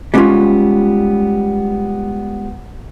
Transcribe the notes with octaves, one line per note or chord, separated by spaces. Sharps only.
G3 G#3 A#3 B3 C#4 F4